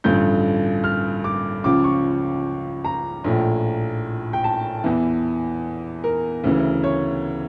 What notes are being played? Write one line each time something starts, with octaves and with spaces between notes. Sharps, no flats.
A1 G2 D3 F3 G6
F6
D6
C#2 C#3 F3 D6
C#6
A#5
A#1 A2 F3
G5
A5
E2 E3
A#4
D2 C#3 E3
C#5